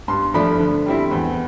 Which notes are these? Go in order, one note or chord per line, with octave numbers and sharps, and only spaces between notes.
G2 C6
F3 A3 D4 B5
D3
G3 C4 E4
E2